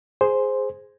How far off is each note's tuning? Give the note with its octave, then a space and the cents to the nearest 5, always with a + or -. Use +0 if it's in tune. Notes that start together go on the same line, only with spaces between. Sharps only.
G#4 +0 C5 +0